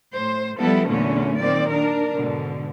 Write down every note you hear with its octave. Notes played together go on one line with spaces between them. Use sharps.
A2 C5
F3 G3 B3 E4 A4
E2 A#2 D3 F#3 A3 C#4
A#2 D#3 C4 D5
D4 A#4
G#2 B2 D3